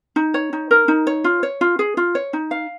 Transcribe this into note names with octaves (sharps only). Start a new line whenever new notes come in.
D#4
C#5
D#4
A#4
D#4
C#5
F4
C#5
F4
G#4
F4
C#5
D#4
F5